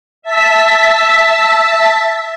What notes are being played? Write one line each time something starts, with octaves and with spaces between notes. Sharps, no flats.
E5 A5 B6